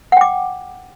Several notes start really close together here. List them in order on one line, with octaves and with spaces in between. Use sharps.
F#5 G5 D6